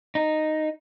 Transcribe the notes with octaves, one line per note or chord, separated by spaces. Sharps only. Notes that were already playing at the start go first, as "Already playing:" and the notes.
D#4